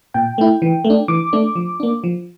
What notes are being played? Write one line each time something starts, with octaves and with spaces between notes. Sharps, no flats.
A#2 G5
A3 E4
E3
A3
D4
E3 D6
A3 D4
F3
A#3 D4
F3